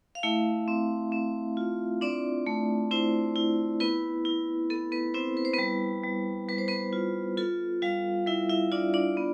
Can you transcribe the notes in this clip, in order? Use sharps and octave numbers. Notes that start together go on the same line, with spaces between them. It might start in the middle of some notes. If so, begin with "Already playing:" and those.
F5
A3 E4 E5
C4
C4
F4
C4 D4 D5
A3
C4 E4 C5
E4
B3 E4 B4
E4
B3 A4
B3 B4
C4 E4 C5
B4
C5
G3 B3 B4
G3
G3 B4
C5
B3 B4
F4
F4 A4
G3 F4 F5
G3 E4 E5
E4 E5
D4 F4 D5
D4 D5
B3